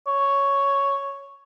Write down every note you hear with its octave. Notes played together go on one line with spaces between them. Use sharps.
C#5